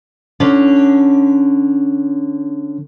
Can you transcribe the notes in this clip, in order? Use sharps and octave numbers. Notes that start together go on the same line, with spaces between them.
D3 C#4